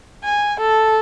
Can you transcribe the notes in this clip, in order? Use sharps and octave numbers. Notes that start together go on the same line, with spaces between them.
G#5
A4